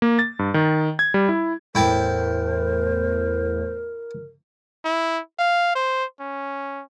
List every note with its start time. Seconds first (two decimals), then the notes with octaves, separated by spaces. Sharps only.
0.02 A#3
0.19 A6
0.39 G2
0.54 D#3
0.99 G#6
1.14 G3
1.29 E4
1.75 E2 A2 E4 A#4 C5 G5 A5
4.85 E4
5.39 F5
5.75 C5
6.20 C#4